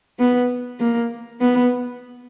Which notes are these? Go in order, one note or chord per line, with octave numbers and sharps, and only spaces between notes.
B3
A#3
B3